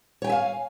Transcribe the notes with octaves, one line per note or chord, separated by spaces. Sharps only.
C#5 E5 F5 G5 G#5